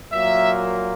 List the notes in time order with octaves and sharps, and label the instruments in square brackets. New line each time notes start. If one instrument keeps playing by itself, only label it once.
[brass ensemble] A#2 F#3 A#3 E5